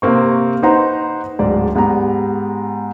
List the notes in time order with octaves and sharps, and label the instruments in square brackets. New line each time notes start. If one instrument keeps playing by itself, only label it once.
[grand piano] C3 A#3 C4 C#6
D#4 B4 C5 F#5 A#5 C6
D1 G#2 D5
G#2 B3 G4 A#5